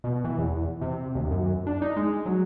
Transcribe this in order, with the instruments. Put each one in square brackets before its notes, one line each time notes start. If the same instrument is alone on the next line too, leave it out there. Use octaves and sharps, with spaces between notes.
[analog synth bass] B2
E3
E2
C3
D#2
F#2
D4
D#4
G#3
F#3